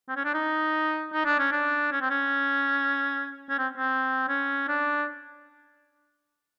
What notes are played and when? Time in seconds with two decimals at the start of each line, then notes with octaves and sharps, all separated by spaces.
0.09 C4
0.16 C#4
0.25 D4
0.34 D#4
1.13 D#4
1.25 D4
1.39 C#4
1.52 D4
1.92 C#4
2.01 C4
2.10 C#4
3.50 C#4
3.58 C4
3.77 C4
4.28 C#4
4.68 D4